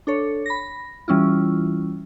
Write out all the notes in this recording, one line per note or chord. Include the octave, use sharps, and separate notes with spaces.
D4 A4 C#5
B5 A#6
E3 G3 C#4 E4 F4